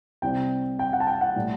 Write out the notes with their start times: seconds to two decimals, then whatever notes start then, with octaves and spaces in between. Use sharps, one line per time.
0.22 C2 C3 G3 G5
0.79 G5
0.93 F#5
1.00 A5
1.07 G5
1.21 F#5
1.36 A2 G3